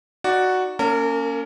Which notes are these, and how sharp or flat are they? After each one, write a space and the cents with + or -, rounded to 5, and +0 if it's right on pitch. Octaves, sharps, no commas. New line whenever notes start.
D#4 +5 F#4 +0 D5 +0
A#3 +0 C#4 +15 A#4 -35